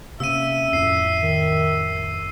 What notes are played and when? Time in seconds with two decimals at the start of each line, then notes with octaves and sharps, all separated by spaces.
0.20 C3 A#3 C#4 E5 E6 D#7
0.73 F2 A2 C7
1.22 D#3